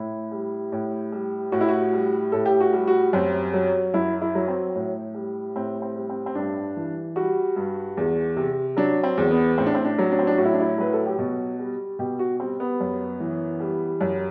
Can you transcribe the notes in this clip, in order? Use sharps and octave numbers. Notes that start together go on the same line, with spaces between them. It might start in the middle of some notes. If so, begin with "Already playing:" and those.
Already playing: A2 E4
G3
A2
G3
A2 F#4
E4
F#4
G3
A2 A4
G4
F#4
G3
F#4
F#2 C4
F#3
F#2 E4
E4
F#3
C4
A2
G3
A2 C4
C4
G3
C4
C4
G2 D4
E3
G3 F#4
G2
E2
C3
F#3 D4
C4
E2
B3
A2 C4
D4
C4
D4
F#3
D4
C4
D4
A2 F#4
E4
D4
E4
F#3 B4
A4
G4
B2 F#4
G3
B2 G4
F#4
G3 C4
B3
F#2
E3
G3
F#2